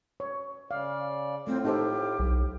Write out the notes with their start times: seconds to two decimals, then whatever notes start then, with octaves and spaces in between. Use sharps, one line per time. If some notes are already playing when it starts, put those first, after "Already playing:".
0.20 C#5
0.71 C#3 D5 F5
1.47 A2 A3 C4 F4
1.65 D#4 G4 A4 C5
2.19 B1